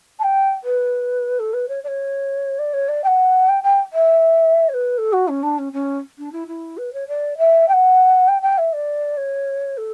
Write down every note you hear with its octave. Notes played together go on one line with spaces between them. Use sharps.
A5
G5
B4
A4
B4
C#5
D5
C#5
D5
C#5
D5
G5
F#5
G5
G5
E5
C#5
B4
A4
F#4
C#4
D4
C#4
C#4
D4
E4
E4
B4
C#5
D5
E5
G5
F#5
G5
G5
E5
D5
C#5
A4